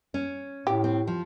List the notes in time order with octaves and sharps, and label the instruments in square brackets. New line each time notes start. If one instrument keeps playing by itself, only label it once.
[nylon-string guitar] C#4
[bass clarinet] A2 [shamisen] G4
[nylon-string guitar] C4
F3